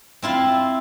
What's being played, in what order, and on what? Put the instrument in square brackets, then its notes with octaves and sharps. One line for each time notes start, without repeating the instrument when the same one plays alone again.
[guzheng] C4 E4 F4 F5